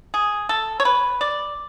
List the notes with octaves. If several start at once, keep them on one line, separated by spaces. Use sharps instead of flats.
G#4
A4
C#5
B4
D5